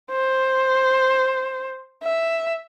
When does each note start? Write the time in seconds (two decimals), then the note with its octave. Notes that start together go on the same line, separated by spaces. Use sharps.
0.12 C5
2.04 E5